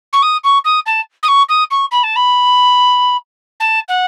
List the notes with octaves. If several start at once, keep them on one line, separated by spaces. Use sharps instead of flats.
C#6
D#6
C#6
D#6
A5
D#6
C#6
D#6
C#6
B5
A5
B5
A5
F#5